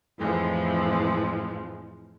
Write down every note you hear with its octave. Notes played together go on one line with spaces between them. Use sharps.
F2 A2 E3 F3 G#3